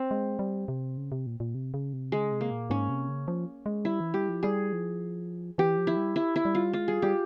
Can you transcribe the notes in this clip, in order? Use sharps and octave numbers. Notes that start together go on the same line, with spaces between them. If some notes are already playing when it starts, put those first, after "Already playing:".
Already playing: C4
G#3
G3
C3
C#3
C3
A#2
A#2
C3
C#3
C3
C#3 G#3
C3
A#3
A#2
G#2 C#4
C3
C#3
F3
G#3
G3 E4
E3
G3 G4
F3
G3 G#4
F3
E3 G4
F3
E4
G3
E4
E4
G3
F4
G#3 F4
G3 G#4
G3 G4